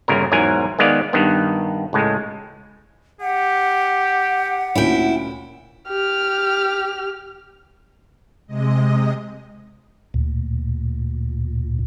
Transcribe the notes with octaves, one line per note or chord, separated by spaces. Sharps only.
G1 A#2 C#3 A#4
E2 G#2 F#3 A#4 F#5 G#5
D#3 G#3 B3 D5 F5
G2 D#3 B3
C#2 A2 G#3
G4 F#5
D2 A#2 C#4 E4 G5
G4 F6
C3 G#3 D#5
D2 A#2